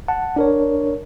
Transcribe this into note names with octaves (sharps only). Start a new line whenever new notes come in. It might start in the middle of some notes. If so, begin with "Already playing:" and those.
F#5 A5
D4 A#4 C#5